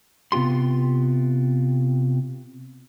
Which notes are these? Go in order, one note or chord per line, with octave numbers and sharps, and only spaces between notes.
C3 B3 F4 G4 C6